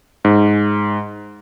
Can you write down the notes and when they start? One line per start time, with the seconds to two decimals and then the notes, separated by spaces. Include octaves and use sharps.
0.25 G#2